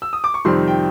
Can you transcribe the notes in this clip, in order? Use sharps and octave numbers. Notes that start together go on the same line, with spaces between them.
E6
D#6
D6
C#6
F2 C3 D#3 G3 C4 C6
G5